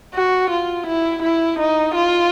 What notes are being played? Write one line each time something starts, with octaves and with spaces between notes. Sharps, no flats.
F#4
F4
E4
E4
D#4
F4